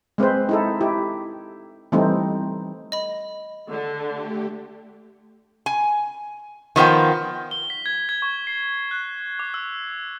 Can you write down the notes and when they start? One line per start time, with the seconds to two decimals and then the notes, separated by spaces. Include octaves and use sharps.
0.18 G#3 C4 B4 C5
0.49 D#4 E4 A4
0.81 E4 G4
1.92 E3 G3 A3 C4 D#4
2.92 D#5 B5
3.69 D3
4.09 A3 G4
5.66 G#5
6.76 D#3 F3 B3 G5
7.51 G7
7.70 B6
7.86 G#6
8.09 G#6
8.22 C#6
8.47 C7
8.91 F#6
9.39 D6
9.54 E6